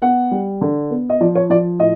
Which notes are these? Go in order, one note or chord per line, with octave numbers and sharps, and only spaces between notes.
B3 F#5
G3
D3
B3
D#5
F3 D5
C#5
F3 D5
A2 D#5